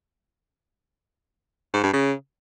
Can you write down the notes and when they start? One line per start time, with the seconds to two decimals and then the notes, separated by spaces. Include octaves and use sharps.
1.74 G#2
1.83 G2
1.93 C#3